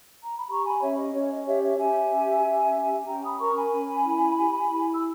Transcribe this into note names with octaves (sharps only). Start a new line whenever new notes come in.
A#5
B5
G4 A#5 C#6
G#5 B5
C#4 C#5 E5
D#5
C#4 C#5
D#5
G4 C#5 E5
C#5 E5
G4 E5 G#5
C#4
G4
C#4
C#4 G5 A#5
B5 D#6
A#4 A#5 C#6
G#5 B5
C#4
E4
G4
E4
E6